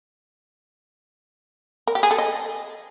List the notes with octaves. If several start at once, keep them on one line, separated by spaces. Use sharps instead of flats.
A#4
G4
G#4
A4
D#5